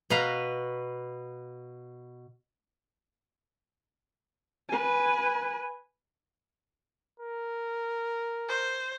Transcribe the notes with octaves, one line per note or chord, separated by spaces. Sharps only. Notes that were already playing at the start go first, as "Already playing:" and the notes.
B2 B4 F5 A#5
B4 G#5
A#4
C5